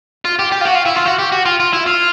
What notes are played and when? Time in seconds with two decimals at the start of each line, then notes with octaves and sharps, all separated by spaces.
0.25 F4
0.39 G4
0.52 G4
0.61 F4
0.65 F#4
0.75 F4
0.86 E4
0.96 F4
1.06 F#4
1.19 G4
1.32 F#4
1.46 F4
1.60 F4
1.73 E4
1.86 F4